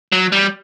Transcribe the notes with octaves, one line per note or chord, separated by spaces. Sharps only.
F#3
G3